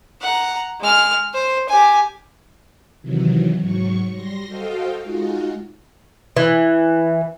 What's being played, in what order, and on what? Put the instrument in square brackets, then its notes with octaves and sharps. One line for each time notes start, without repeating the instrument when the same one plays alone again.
[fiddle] F#5 A#5
G#3 F6
C5
G4 G#5
[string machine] C3 D#3 E3 F#3
G#2 F#3 C#6
G3 C6 A#6
F#4 A4 C5 D#5 F5 G5
G#3 D#4 F4 F#4
[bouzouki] E3